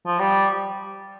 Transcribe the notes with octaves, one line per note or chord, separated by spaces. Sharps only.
F3
G3